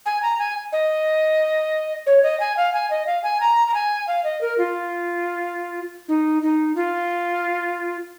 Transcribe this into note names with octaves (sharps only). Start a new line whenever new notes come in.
G#5
A#5
G#5
D#5
C#5
D#5
G#5
F5
G#5
D#5
F5
G#5
A#5
A#5
G#5
F5
D#5
A#4
F4
D#4
D#4
F4